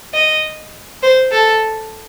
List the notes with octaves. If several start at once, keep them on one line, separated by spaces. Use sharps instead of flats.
D#5
C5
A4